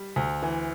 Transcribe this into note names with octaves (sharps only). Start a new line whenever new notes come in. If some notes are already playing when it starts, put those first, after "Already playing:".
Already playing: G3
D2
E3